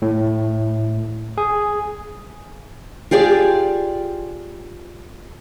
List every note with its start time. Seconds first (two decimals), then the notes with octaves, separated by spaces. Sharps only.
0.02 A2
1.38 G#4
3.11 F4 G4 G#4 D5